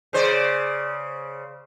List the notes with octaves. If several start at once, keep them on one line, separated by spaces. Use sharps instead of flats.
C#3 C5 D5